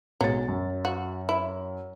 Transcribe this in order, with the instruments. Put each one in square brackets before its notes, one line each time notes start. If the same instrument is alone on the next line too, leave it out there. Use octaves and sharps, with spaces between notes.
[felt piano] B1 G#3 A6 [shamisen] F#3
[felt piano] F#2
[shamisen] F#4
E4